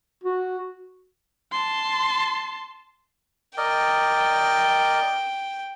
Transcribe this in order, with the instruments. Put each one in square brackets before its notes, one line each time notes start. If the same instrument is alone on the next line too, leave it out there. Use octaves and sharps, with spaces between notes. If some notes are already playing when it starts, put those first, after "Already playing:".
[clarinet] F#4
[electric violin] A5 C6
[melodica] A#4 D5 D#5 [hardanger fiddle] G5